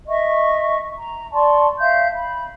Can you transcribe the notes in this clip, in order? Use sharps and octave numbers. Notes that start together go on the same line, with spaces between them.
D#5 E5 C#6
A#5
D5 A5 C6 C#6
E5 F5 G6
B5